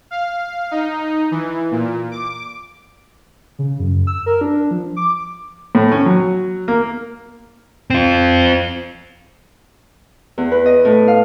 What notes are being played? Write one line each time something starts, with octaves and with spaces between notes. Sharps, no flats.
F5
D#4
E3
A#2
D6
C#3
F#2
E6
A#4
D4
F3
D6
A2
C#4
F#3
A#3
C4 F4
E2
B4
D#5
A2
F5